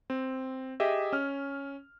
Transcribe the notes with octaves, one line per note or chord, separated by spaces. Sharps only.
C4
G4 G#4 D#5 E5
C#4 F6